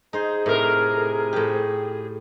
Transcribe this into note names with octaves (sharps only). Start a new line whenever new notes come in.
D#4 G#4 C5
A2 C3 A#4
A2 G4